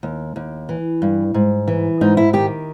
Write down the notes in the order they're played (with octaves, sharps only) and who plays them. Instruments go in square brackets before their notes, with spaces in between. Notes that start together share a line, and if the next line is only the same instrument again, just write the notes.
[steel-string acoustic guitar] D#2
D#2
E3
G2
G#2
E3
G#2 D#4
E4
D#3 G4